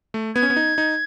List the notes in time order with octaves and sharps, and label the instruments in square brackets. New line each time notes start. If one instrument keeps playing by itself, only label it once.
[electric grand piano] A3
[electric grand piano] B3 [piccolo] G#6
[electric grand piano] C#4
B3
D#4
D#4